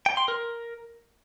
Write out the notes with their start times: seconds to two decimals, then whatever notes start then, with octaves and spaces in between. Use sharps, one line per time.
0.06 G5
0.17 C6
0.28 A#4